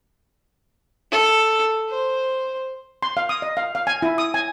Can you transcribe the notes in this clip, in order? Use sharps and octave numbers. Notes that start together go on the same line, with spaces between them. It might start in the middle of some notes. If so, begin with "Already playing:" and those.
A4
C5
C6
F5
D#6
D#5
F5
F5
G#5
E4
D#6
G#5